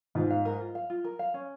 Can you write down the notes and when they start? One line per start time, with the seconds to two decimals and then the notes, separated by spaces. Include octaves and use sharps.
0.15 G#2 F4
0.30 F5
0.45 A#4
0.61 F4
0.75 F5
0.90 F4
1.04 A#4
1.19 F5
1.34 C#4